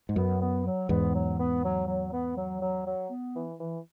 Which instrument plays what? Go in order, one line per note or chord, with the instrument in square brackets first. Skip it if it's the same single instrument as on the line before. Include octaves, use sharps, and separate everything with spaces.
[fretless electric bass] G#2
[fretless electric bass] F#2 [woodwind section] B3
[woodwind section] B3
F#3
[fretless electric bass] E2 G#2 [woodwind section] B3
[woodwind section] F#3
B3
F#3
F#3
B3
F#3
F#3
F#3
B3
E3
E3